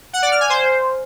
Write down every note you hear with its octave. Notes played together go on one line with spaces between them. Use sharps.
F#5
D5
F6
G#5
C5